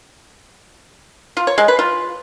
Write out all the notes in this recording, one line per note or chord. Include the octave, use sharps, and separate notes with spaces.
F4
C#5
G#3
B4
F4